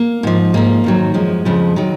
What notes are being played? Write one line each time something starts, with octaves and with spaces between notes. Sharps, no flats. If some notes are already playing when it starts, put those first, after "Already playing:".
Already playing: A#3
G#2 F3
G#2 F3 A#3
F2 D#3 F#3
F#2 F3 G#3
F2 C#3 F3
D#3 F#3